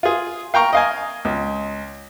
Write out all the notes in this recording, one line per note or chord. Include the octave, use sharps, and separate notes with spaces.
F4 G#4
F5 G5 A#5 C#6
D#5 F5 G#5
C#2